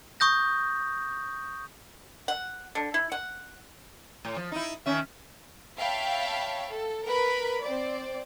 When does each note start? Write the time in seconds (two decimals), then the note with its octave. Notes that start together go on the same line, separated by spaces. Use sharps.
0.20 C#6 D#6 G6 A#6
2.28 F#5
2.75 D3
2.94 E4
3.12 F#5
4.25 A2
4.36 F3
4.52 D#4 E4
4.86 D#3 C#4 E5
5.76 C#5 E5 F5 G5 A5 B5
6.70 A4
7.06 A#4 B4 B5
7.64 C4 C5 D5